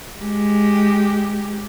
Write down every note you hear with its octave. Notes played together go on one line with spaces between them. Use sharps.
G#3 G4